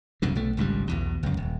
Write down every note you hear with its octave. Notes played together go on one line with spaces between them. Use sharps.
C2 F#2 B2 D3
B1 A3
G#1 C#2 G2 G3
B1 E2 B2
C#2 F#2
D#1